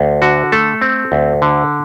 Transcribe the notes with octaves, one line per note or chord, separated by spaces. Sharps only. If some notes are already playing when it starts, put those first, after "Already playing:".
Already playing: D2
D3 F#4
A3 A4
C4
D2
D3